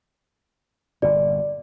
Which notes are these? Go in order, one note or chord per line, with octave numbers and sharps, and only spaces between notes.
G1 A#2 D5